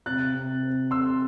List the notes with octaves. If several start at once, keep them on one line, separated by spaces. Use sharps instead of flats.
C3 F#6 A6
C3
C4
C3 C6 E6